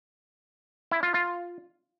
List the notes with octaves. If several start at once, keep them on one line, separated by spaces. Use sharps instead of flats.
E4
F4
F4